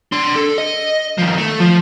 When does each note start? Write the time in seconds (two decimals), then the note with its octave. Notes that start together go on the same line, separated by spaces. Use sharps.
0.12 D4 C6
0.36 A4
0.58 D#5
1.18 D#3 F3
1.37 A3
1.60 F3